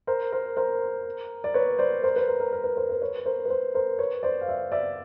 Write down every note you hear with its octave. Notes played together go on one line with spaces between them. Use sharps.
A#4 C5
A#4 C5
A#4 C5
D5
B4 C#5
C5 D5
A#4 C5
B4
A#4
A#4
A#4
B4
A#4 C5
B4
B4 C#5
A#4 C5
B4
A#4 C5
A#4 C5
B4 C#5
C5 D5
F5
D5 E5
D5 E5